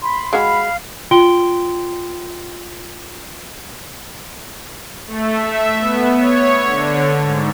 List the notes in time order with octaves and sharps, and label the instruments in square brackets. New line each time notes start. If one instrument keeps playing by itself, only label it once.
[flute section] B5 C6
[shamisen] G#3 F#4 [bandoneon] F5 [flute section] B5
[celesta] F4 G5 C6 D7 G7
[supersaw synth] A3
E5
B3
C#5
D3
G#2